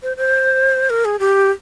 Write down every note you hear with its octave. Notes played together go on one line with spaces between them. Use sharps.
C5
C5
A#4
G#4
G4